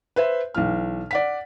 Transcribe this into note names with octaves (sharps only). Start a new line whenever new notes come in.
B4 C5 E5
B1 E3 F6
D5 F#5 B6